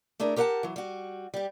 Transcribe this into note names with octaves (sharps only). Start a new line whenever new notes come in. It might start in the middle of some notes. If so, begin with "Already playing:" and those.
A3 D4 E4 G#4 A#4
G4 A#4 C5 F5 F#5 A5
E3 F#3
G3 F#4
G3 G4